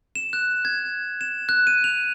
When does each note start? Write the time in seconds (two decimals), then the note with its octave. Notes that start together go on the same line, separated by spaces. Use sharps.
0.15 E7
0.33 F#6
0.65 G#6
1.21 E7
1.49 F#6
1.67 D#7
1.84 F7